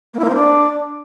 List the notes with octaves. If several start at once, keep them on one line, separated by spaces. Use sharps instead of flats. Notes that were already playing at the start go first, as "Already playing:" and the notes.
A#3
E4
A#3
C4
D4